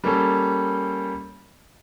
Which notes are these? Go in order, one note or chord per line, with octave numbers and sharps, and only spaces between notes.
G3 A#3 C#4 A4